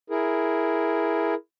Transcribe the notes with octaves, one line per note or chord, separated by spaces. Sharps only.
E4 G#4 A#4